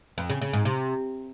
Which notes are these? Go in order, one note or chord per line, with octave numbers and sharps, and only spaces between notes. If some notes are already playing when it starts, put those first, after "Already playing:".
F2
C#3
C#3
G#2
C3